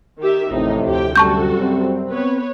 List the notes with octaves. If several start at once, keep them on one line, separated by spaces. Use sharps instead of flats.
D#3 G4 E5
A1 F2 A2 C3 D#4
D2 G4 G5
F#2 C3 G3 F#4 A4 A5 C#6 G6
C4
B3 B4 C#5